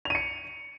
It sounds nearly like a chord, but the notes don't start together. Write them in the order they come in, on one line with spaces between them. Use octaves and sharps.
F7 D#7 C#7